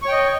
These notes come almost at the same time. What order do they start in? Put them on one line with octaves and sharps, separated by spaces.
C#6 C#5 G5 D#5